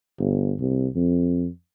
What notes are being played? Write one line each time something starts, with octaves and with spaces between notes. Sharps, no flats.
G1
C2
F2